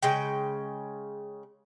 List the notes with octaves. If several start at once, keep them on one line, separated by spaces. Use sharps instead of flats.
C#3 G#3 G5